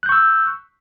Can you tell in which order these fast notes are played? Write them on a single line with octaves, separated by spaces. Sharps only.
F#6 G6 C#6 E6